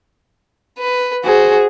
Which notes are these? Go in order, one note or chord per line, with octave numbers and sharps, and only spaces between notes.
B4
F#4 G#4 C5